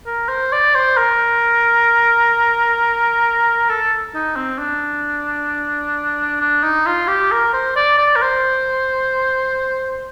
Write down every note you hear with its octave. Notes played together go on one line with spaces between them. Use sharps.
A#4
C5
D5
C5
A#4
A4
D#4
C4
D4
D4
D#4
F4
G4
A#4
C5
D5
D5
A#4
C5